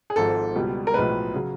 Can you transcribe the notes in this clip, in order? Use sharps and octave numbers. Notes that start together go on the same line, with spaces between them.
G#4
G#1 G#2 F3 A4
C#2 B2 G3
A#4
B1 A2 F3 G#3 B4
C#3 F#3